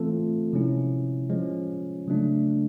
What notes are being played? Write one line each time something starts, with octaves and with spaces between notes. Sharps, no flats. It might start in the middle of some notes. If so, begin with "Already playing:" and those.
Already playing: E3 A3 C4 F4 A4
C3 F3 G#3 C#4 E4
F3 G#3 C#4
C#3 F#3 A3 D4